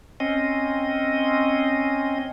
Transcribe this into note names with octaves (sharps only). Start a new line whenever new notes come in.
C4 C#4 D#5